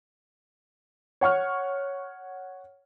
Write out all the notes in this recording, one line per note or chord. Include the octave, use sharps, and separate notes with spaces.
C#5 F#5 C#6 F6